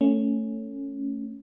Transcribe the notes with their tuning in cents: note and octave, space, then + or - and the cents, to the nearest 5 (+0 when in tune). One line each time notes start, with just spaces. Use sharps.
A3 +15 C#4 +0